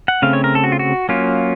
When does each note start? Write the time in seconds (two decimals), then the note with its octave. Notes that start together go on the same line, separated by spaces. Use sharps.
0.08 F#5
0.22 C#3 A3 C4 F5
0.33 C#5
0.44 A#4
0.55 A4
0.64 F#4
0.72 F4
0.79 F#4
1.09 F#3 A#3 C#4 F4